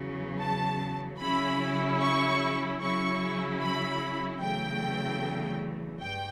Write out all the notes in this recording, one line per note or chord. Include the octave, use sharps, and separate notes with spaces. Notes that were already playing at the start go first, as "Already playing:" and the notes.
Already playing: E2 C#3 F#3
A5
C#3 F#3 C#4 E4 B5
C#6
C#3 F#3 C#4 E4 C#6
B5
E2 C#3 F#3 A3 G5
G2 G5